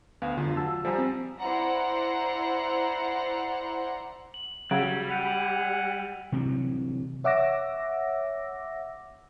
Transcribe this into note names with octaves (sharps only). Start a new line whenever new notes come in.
D2 B3 F5
F1 E2 G2 D3 F4
F#3 F4 A5 E6
F3 G3 C5 G#5 A#5
C4
E4 C5 D5 F#5 A#5
F#7
C#3 F#3 G3 E6 G#6 D7
F#5 G6 D#7 F7
C3 E3 F#3
C#5 E5 F#5 D6 E6 A#6